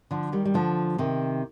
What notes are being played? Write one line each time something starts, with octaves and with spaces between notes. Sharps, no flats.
D3 F3
D#3 G3
G3
D3 F3
C3 D#3